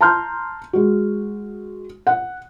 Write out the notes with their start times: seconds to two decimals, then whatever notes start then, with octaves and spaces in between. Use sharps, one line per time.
0.01 A5 A#5 C6 F6 G6
0.73 G#3 F#4
2.07 F#5